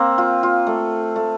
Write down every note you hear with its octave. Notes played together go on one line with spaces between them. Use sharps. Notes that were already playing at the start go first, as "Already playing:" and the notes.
Already playing: A#3 C4
F4
F4
A3
A3